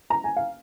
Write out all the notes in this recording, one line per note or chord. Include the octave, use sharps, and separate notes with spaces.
A#5
G#5
F5